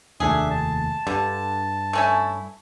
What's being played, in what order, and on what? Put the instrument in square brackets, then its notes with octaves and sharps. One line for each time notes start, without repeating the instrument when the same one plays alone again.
[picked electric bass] F1 D#2 A3 [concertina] D4 E5 [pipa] G#4
[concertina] A5
[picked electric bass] G2 [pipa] D3
[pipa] A3 C#4 E4